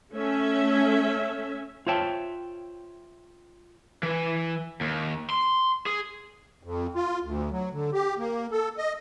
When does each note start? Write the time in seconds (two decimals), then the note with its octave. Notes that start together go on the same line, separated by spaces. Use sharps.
0.13 A3 C#4 E5
1.87 F4 C5 C#5 E5 G5 A5
4.03 E3
4.81 D#2
5.30 C6
5.86 G#4
6.63 F2
6.95 F4
7.23 D2
7.51 F#3
7.73 D3
7.93 G4
8.18 A#3
8.51 A4
8.77 D#5